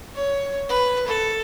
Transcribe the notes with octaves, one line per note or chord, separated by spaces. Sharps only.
C#5
B4
A4